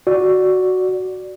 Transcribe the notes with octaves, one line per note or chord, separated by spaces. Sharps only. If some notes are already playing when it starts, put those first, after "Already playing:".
F#4 D5